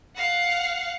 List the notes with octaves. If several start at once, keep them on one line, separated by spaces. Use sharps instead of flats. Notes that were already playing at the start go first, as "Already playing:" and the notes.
F5 F#5